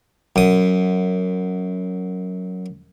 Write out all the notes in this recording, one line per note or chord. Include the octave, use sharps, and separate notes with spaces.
F#2 D#6